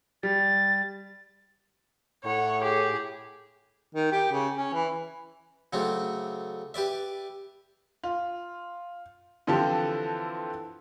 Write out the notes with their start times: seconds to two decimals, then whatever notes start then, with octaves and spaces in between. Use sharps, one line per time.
0.23 G3 A6
2.24 A2 C#5 F#5
2.62 G4 G#4
3.95 D#3
4.12 G4
4.31 C#3
4.57 C#4
4.73 E3
5.73 C#3 F#3 A3 C4 D4
6.74 G4 B4 D5 E5
8.04 F4
9.47 D3 E3 F3 C4 G4 A4